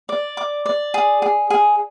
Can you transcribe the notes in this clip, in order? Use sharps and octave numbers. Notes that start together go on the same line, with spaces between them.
D5
D6
D5
G#4
G#4
G#4